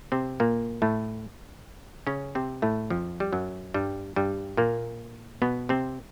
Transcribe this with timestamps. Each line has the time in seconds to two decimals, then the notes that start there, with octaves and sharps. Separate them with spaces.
0.12 C3 C4
0.40 A#2 A#3
0.82 A2 A3
2.07 C#3 C#4
2.35 C3 C4
2.62 A2 A3
2.90 F2 F3
3.20 G3
3.33 F#2 F#3
3.74 G2 G3
4.16 G2 G3
4.57 A#2 A#3
5.42 B2 B3
5.69 C3 C4